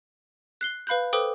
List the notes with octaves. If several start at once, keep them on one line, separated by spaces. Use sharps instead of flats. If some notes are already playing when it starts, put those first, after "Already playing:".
F#6 C7 G7
B4 F5 B5 F#6 G6
A4 B4 C5 G5 D6 D#6